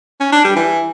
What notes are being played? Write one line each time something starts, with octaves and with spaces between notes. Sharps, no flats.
C#4
D4
G3
E3